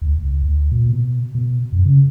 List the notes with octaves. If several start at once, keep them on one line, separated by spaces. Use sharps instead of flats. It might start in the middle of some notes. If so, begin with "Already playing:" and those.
D2
C#2
D2
A#2
B2
B2
F#2
C#3